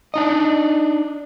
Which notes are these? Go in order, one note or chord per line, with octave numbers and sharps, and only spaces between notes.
D4 D#4 D#5